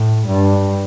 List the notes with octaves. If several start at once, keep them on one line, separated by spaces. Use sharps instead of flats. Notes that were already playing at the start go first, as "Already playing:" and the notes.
Already playing: A2
G2